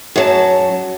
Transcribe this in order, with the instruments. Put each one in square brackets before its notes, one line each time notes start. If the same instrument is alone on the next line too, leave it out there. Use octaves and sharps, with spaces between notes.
[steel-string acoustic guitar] F#2 F#3 A5